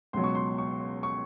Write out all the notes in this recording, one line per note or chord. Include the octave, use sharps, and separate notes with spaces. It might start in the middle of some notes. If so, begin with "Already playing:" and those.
C#2 B2 F#3 C6
C#6
C6
C#6
C#6